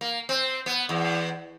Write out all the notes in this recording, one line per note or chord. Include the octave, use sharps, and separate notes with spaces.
A#3
C4
B3
E2